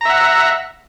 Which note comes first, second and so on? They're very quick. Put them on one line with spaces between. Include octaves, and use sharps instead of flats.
A#5 E5 F#5